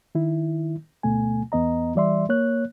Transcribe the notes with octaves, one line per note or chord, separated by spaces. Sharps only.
D#3 E4
D2 B2 A3 G#5
E2 B3 D#5 A#5
E3 G3 D5 E5 C6
A#3 C#5 F#6